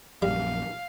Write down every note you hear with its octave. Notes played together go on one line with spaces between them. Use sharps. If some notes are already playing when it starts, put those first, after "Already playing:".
A#1 F#2 G3 F5